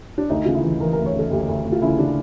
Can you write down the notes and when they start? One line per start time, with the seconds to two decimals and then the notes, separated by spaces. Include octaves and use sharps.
0.18 D4
0.30 D2 D#4
0.45 C#3 F4
0.55 E4
0.63 E3
0.80 E3 A#4
0.93 A#4
0.98 D2
1.06 C#5
1.14 C#3 A4
1.31 D2 G4
1.48 D2
1.65 D2
1.72 F4
1.82 C#3 E4
1.99 C#3 D4